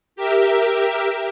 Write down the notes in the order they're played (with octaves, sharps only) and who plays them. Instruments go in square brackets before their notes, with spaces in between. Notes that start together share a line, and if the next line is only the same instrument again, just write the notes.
[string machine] G4 A#4 E5